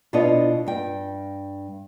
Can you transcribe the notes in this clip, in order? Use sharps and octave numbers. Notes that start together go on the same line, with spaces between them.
B2 D4 E4 F4 C#5 D#5
G2 G5